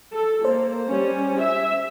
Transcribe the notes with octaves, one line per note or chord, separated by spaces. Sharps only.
A4
A#3 C5
G3 C#4
E5